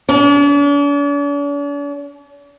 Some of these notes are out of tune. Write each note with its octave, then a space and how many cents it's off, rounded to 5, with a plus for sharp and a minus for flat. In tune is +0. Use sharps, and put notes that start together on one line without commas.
D4 -45